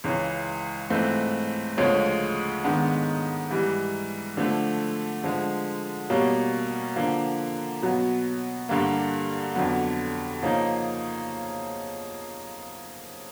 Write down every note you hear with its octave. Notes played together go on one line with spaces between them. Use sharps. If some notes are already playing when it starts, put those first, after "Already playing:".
C#2 C#3 E3
G#2 E3 A3 C4 F4
D2 C#3 F3 G#3 C#4
G#2 D#3 G#3 B3 D4
G#2 E3 G3
D3 F3 A3
D3 F3 G#3
B2 G3 A#3 C#4
D3 F3 A#3
B2 F#3 B3
G2 D3 G3 A#3
F2 D3 F#3 B3
C#3 F3 A#3 D#4